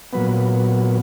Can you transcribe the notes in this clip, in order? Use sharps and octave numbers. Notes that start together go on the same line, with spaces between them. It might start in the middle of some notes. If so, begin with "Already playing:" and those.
A#2 F#3 B3 B4